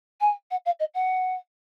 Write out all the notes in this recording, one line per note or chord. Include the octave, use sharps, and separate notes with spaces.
G#5
F#5
F5
D#5
F#5